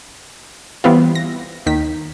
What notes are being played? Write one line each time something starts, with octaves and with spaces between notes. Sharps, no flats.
E3 G3 B3 C4 F4
A#6
D#2 D#3 B6